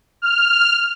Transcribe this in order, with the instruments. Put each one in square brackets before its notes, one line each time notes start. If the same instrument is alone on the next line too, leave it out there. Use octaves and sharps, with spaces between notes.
[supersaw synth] F6